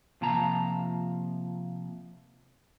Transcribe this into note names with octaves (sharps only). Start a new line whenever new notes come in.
C3 F3 A#3 A5 A#5